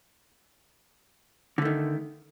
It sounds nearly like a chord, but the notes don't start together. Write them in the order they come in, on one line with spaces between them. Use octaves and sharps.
D3 A3 D#3